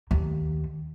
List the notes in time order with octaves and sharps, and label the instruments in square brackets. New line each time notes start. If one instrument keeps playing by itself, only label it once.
[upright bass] D#2